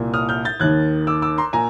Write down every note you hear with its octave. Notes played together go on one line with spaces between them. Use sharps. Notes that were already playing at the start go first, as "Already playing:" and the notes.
Already playing: C2 A#2
D#6 F6
F6 G6
G6 A6
D#2 D#3 F#6 G#6
D6 E6
D6 E6
A#5 C6
A#2 G#5 A#5